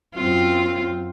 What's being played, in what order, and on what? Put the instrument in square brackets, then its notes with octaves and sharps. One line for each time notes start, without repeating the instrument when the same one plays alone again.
[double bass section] F#2 C4 [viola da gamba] F4